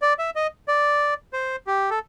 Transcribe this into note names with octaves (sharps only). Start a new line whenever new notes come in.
D5
E5
D#5
D5
C5
G4
A4